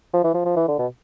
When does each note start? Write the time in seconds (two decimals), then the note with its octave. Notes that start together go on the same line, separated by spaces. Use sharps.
0.14 F3
0.24 E3
0.34 F3
0.46 F3
0.56 E3
0.68 D3
0.79 B2